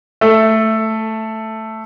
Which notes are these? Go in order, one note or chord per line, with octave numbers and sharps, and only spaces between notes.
A3 A4